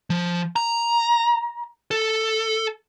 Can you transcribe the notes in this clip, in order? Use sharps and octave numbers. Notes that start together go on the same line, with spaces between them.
F3
A#5
A4